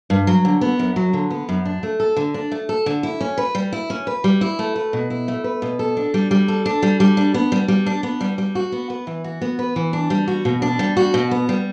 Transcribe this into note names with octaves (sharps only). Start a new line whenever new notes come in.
G2
F#3
D3
B3
F#2
F#3
D3
B3
F#2
D4
A3
A4
D3
D4
A3
A4
D3
E4
C#4
B4
G3
E4
C#4
B4
G3
E4
A3
B4
B2
E4
A3
B4
B2
A4
D4
G3
G3
A4
D4
G3
G3
D4
B3
G3
G3
D4
B3
G3
G3
F#4
B3
B4
E3
F#4
B3
B4
E3
D4
G3
F#4
B2
D4
G3
F#4
B2
B3
G3